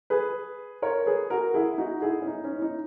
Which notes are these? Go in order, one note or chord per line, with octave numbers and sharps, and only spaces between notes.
G#4 B4
A#4 C#5
G#4 B4
F#4 A#4
E4 G#4
D#4 F#4
E4 G#4
C#4
D#4
C#4
E4
D#4